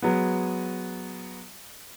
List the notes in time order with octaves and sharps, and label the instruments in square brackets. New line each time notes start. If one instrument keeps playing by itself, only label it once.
[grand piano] F#3 G#3 B3